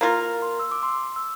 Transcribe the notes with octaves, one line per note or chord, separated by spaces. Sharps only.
A#3 F4 A#4
C6
E6
D6
C6
E6